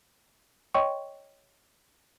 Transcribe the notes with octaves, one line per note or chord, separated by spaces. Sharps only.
C#5 D#5 G5 C6 C#6